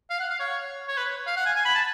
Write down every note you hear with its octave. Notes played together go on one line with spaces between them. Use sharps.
F5
F#5
F5
C#5
C#5
B4
F5
F#5
G#5
G#5
B5
A5